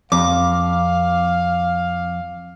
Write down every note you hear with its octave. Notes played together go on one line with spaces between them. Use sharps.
F2 F5 D6